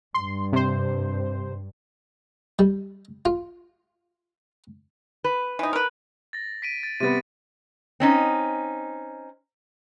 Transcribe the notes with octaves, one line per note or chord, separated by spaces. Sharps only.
G2 C6
C3 C5
G3
F4
B4
E3 D#4
A#4 B4
A6 A#6
B6 D7 D#7
A6
C3 G3 B3 A6 D#7
C4 C#4 D#4